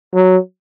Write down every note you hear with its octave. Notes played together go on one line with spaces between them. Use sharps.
F#3